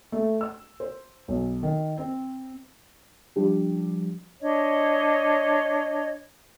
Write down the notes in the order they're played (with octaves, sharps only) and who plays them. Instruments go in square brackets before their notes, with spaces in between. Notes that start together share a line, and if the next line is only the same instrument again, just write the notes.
[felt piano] A3
E6
C5
B1
D#3
C4
[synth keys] F3 G3 D4 G4
[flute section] D4 C#5 D#5